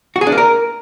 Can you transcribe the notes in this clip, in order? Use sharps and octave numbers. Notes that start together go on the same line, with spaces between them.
F#4
G#4
D4
A#3
A#4